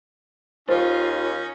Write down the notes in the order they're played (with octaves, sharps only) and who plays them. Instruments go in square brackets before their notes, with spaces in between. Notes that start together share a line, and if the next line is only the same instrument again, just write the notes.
[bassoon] D#2 [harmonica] C#4 D#4 [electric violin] F4 [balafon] C5